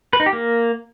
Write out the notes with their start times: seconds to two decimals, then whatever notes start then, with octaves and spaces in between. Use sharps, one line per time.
0.13 B4
0.20 D#4
0.26 G4
0.33 A#3